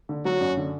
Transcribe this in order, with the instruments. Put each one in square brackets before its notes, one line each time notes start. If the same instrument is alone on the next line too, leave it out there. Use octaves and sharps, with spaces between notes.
[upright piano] D3
[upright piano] F#3 [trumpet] F#4
[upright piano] F#2
D3